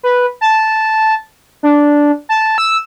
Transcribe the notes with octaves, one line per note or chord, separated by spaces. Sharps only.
B4
A5
D4
A5
E6